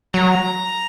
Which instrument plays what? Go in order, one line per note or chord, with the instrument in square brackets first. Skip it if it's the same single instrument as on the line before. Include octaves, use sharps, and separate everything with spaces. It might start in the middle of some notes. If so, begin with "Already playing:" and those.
[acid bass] F#3 [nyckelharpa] A#5